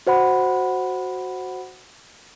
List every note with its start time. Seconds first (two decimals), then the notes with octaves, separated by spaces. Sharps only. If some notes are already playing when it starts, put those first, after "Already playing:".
0.07 F#4 C5 F#5 B5